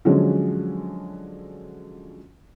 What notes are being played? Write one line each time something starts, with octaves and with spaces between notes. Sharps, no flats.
D3 F3 F#3 G#3 C#4